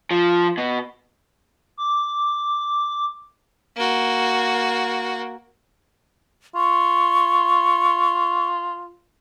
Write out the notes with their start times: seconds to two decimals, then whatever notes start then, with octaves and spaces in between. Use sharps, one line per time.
0.11 F3
0.58 B2
1.77 D6
3.76 A#3 F#4
6.55 F4 C#6